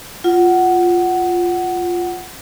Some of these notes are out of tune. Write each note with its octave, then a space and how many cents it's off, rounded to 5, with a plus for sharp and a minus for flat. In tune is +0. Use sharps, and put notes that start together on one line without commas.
F4 +0 F#5 +10